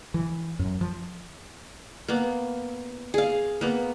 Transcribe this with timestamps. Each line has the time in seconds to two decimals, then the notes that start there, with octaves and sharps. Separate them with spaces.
0.14 E3
0.59 F#2
0.81 F3
2.08 A#3 B3
3.14 G#4 F5
3.61 A#3 B3